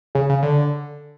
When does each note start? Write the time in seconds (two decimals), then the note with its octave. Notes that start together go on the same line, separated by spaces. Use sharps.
0.15 C#3
0.29 C#3
0.43 D3